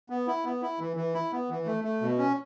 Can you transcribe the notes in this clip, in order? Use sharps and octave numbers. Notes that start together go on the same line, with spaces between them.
B3
E4
B3
E4
E3
E3
E4
B3
E3
A3
A3
B2
C#4